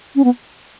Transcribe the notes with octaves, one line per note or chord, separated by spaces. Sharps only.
C#4
B3